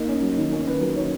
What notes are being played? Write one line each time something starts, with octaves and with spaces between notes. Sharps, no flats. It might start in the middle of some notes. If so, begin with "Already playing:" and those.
Already playing: A#3 D#4 D#5
C#4
F#3
D#3
A#3 C#4 C#5
D#3 B4
F#3 A#4
D#3 C#4 C#5